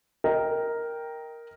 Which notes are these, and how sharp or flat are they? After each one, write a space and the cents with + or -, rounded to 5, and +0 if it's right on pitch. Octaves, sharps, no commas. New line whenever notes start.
A#4 +0 D#5 +25 G5 +0